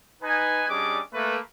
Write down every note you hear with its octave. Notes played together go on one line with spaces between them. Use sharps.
D#4 B4 G#5
G3 C#4 D4 G#4 D#5 D6
A3 A#3 B4